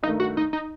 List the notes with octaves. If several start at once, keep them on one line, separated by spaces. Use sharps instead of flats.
G2 D#3 A3 D#4
F#4
D#4
D#4